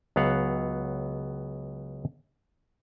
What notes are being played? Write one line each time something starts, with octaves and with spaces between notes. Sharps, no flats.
C#2 F#3 B3 F5 F#5